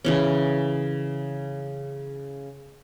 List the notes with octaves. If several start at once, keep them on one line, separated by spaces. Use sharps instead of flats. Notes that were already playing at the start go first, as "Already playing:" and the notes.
C#3 E3 C#4